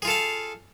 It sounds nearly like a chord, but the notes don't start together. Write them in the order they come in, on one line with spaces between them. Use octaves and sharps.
G#4 F4 A4 F5